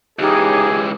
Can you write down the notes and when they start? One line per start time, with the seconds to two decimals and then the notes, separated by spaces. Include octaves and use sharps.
0.19 C#2 E3 D#4 G4 G#4 C#5